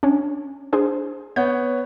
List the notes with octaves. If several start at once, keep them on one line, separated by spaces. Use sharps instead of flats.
C#4 D4
D4 G#4 C5
B3 C#5 F#5 G6